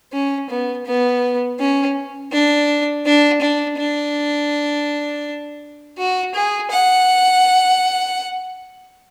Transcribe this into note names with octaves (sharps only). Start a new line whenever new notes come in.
C#4
B3
B3
C#4
D4
D4
D4
D4
F#4
G#4
F#5